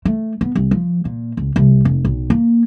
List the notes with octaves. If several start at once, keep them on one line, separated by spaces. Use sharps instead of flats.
A3
B3
C2
F3
A#2
C#2
C2
F1
B1
A#3